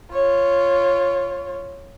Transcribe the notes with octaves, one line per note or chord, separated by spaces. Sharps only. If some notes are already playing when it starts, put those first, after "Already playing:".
F4 C#5